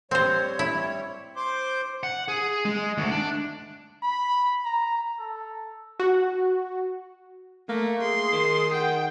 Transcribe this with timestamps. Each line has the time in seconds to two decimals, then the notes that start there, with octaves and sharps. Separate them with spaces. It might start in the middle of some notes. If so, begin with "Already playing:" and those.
0.11 G3 C4 C5 C#5
0.59 E4
1.36 C5 C6 D6
2.03 F#5
2.28 G#4
2.65 G#3
2.98 D2
3.11 D4
4.03 B5
4.65 A#5
5.19 A4
6.00 F#4
7.69 A3 A#3
8.02 G#4 C6
8.32 D#3
8.73 F#5 G5